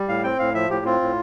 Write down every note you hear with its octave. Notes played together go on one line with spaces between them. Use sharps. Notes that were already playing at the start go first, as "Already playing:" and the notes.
Already playing: G3
A2 F5
C4 G5
A2 F5
F3 E5
A2 G4
C4 F4
A2